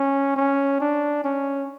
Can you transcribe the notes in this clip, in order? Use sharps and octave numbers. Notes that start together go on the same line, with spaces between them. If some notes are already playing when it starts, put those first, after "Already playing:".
Already playing: C#4
C#4
D4
C#4